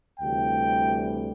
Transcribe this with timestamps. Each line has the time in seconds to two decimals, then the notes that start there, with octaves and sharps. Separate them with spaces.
0.20 D2 C3 E3 G3 G5